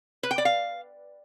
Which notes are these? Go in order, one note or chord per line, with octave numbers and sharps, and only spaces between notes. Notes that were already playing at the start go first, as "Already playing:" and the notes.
B4
G5
D5
F5